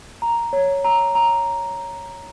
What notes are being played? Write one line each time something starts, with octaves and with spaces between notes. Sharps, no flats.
A#5
C#5
A#5
A#5